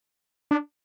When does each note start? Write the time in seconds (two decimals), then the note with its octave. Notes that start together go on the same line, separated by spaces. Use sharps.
0.51 D4